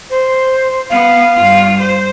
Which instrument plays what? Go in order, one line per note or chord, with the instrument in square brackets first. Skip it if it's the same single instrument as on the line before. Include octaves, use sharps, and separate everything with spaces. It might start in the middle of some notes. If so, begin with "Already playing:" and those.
[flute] C5
[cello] B3 [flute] F5
[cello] G2 F4
C5